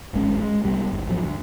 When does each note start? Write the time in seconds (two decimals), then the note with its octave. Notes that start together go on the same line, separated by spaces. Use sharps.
0.13 D1 G#1 G#3 C#4
0.40 G#3
0.64 C2 G3 G#3 B3
0.91 G1 D2
1.09 A1 F3 F#3
1.24 D2